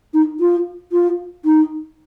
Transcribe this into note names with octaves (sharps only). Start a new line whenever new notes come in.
D#4
F4
F4
D#4